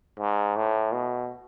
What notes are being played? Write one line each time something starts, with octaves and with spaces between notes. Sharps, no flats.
G#2
A2
B2